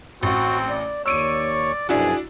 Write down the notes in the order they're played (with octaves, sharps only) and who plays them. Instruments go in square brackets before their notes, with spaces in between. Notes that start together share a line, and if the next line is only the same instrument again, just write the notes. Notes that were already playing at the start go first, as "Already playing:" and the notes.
[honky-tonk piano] A1 [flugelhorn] C4 [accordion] F#4
[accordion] D5
[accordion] D#2 C#5 C#6 [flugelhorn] D5 [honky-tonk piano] E6 D7 D#7
[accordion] F#2 B2 F3 [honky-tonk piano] D4 E4 F#4 [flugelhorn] G#4